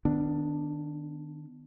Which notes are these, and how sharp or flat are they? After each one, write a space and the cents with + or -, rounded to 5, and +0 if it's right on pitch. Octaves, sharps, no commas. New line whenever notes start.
D#3 -30 B3 +15 D4 +0